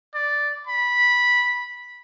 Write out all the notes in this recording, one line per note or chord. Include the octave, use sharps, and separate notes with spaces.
D5
B5